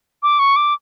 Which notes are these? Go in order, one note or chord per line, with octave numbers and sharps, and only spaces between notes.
D6
C#6
D6